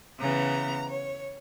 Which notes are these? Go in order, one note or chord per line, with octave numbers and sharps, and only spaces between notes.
C#3 E3 B3 A#5
C#5